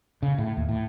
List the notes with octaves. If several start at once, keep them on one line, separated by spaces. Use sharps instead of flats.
C#3
A2
D#2
A2